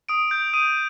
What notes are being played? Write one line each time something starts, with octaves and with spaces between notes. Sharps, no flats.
D#6 D7
G6
D#6 D#7